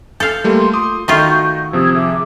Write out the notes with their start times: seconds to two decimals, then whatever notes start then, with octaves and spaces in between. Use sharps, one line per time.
0.20 A4 F5 G6
0.44 G3 A3 A#3 C6
0.73 F4 C6 D6 D#6
1.08 D#3 A3 F4 F#4 D#5 C#6 G6
1.73 C3 F3 D#6 E6 G#6
1.94 G#4 E5 D6